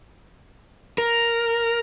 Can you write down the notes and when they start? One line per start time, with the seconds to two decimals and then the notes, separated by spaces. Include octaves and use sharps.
0.98 A#4